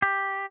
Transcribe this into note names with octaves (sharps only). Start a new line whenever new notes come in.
G4